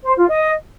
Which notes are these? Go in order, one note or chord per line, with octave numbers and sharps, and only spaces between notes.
C5
F4
D#5